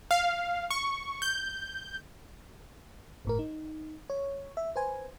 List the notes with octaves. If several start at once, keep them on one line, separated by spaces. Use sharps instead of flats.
F5
C#6
G6
G1 A2 A#4
D#4
C#5
E5
B4 C5 G#5